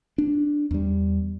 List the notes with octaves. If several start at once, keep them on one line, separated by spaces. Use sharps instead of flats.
D4
E2 G3